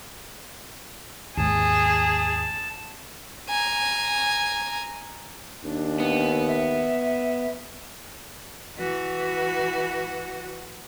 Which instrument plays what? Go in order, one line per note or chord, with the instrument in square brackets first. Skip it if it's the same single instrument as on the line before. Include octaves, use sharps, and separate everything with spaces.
[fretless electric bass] D#2 G#2 [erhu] G#4 [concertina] A5
[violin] G#5 A#5
[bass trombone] D#2 [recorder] D4
[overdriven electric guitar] B3
[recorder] E5
[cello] E3 F#4